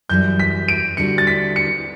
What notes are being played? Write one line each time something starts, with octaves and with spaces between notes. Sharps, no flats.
F#2 E3 G3 G6
B6
D7
D3 G3 D4 F#4 C#7
A6
B6
C#7